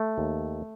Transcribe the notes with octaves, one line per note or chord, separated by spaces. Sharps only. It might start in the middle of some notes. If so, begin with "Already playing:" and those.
Already playing: A3
D#2